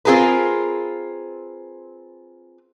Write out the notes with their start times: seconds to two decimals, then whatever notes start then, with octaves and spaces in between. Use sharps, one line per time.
0.05 C4 F4 G#4 A#4 B4